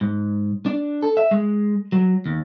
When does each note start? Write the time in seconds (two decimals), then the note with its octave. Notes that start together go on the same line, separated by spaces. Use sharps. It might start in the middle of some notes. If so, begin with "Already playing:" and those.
0.01 G#2
0.66 D4
1.02 A4
1.17 E5
1.31 G#3
1.92 F#3
2.26 D#2